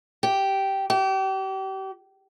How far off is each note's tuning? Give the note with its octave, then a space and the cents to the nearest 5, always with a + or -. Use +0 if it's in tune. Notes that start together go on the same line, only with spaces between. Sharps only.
G4 -10
G4 -35